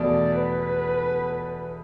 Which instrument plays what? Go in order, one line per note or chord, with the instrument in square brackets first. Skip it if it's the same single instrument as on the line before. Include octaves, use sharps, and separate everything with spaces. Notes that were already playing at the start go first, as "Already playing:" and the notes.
Already playing: [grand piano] E2 B2 A3 [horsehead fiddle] D5
[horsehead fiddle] B4